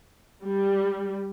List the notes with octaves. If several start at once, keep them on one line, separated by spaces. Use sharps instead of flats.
G3